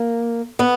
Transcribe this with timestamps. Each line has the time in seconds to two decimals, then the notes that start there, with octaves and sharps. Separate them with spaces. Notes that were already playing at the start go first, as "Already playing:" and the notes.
Already playing: A#3
0.59 B3